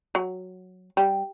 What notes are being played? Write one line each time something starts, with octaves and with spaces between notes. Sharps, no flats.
F#3
G3